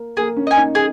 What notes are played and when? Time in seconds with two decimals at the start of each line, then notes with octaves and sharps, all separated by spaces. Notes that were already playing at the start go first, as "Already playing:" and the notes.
Already playing: A#3
0.17 A#3 G#4
0.37 C#4
0.47 D#5 G#5
0.56 D#4
0.75 G#4